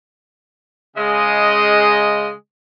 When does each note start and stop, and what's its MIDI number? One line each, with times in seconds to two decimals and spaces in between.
0.96 2.31 49
0.96 2.31 56
0.96 2.31 75